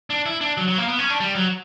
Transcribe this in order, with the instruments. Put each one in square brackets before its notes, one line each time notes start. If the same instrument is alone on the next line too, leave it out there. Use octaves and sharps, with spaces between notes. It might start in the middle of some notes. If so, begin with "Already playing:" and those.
[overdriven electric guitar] D4
E4
D4
F#3
F#3
A#3
B3
C#4
D4
G3
F#3